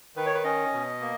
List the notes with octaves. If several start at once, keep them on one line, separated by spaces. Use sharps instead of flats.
D#3 B4
C#5
B4
C#4 D#5
B2
A#3